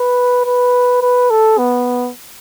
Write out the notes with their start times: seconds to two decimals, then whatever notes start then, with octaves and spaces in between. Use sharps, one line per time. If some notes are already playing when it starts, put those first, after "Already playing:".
Already playing: B4
0.46 B4
1.02 B4
1.31 A4
1.58 B3